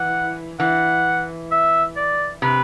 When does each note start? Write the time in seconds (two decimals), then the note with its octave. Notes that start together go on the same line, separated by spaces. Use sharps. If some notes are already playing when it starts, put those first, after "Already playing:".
Already playing: E3 F#5
0.60 E3 F#5
1.51 E5
1.97 D5
2.42 C3 B4